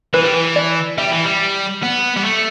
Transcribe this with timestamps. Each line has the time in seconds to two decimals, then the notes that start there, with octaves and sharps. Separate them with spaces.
0.14 E3 B4
0.23 G3
0.32 E3
0.56 D5
0.98 G3 E5
1.11 E3
1.24 G3
1.83 B3
2.17 G3
2.25 A3